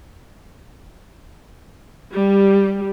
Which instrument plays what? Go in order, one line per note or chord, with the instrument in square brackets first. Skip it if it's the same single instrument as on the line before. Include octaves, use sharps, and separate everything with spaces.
[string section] G3